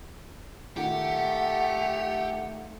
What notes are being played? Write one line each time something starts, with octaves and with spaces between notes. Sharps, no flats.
A#2 D#3 A3 G4 F#5